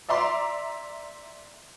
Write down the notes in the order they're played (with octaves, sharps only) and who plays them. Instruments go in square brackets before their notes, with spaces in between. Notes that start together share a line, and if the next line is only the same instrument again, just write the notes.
[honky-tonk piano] D5 E5 A#5 C6 D6